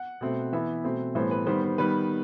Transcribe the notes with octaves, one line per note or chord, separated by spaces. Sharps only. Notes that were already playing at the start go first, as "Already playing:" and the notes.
Already playing: F#5
B2 A3 C4
E3 B3 E5
B2 A3 C4
A2 E3 G3 B3 C5
B4
D#3 G3 B3 C5
C5
D#3 G3 B3 B4